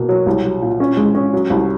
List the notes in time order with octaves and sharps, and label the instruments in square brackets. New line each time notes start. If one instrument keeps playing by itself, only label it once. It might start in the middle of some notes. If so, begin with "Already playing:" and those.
Already playing: [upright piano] B2 A#3
F#3
C2
F#3
A#2
C#4
G#3
C#4
F#3
C2